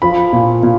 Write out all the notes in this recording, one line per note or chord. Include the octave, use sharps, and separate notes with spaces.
F3 B5
A#2
A#2